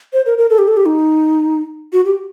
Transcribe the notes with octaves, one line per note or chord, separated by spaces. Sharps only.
C5
A#4
A#4
A4
G4
A4
G4
D#4
F#4
G4